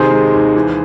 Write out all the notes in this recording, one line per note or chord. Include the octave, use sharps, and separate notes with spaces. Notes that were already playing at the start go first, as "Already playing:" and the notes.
Already playing: C3 D#3 G#4 C5
G#3
D#2
E3